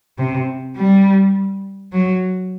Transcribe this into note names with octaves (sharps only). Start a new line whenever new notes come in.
C3
G3
F#3